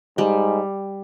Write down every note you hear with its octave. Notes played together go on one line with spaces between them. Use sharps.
G#2 G3